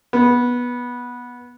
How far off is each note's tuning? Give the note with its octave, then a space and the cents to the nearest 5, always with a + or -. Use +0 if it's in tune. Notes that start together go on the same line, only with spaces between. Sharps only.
B3 -15